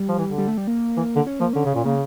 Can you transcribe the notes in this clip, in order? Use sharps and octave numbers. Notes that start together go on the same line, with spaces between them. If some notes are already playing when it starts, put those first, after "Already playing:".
Already playing: G3
F3
E3
D3
G3
A3
G3
A#3
E3
D3
C#4
F3 A#3
D3 C#4
C#3
A#2
C#3 A#3